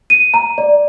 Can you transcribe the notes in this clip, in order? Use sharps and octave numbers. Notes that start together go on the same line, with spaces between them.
D#7
A#5
D5